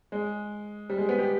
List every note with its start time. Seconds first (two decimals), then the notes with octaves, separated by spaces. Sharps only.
0.12 G#3
0.90 G3
0.98 G#3
1.09 B3
1.18 G4